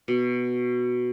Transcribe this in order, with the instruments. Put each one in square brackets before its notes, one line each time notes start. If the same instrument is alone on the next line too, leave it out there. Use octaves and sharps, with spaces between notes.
[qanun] B2